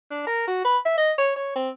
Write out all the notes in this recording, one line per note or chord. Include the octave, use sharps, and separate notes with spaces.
D4
A#4
F#4
B4
E5
D#5
C#5
C#5
C4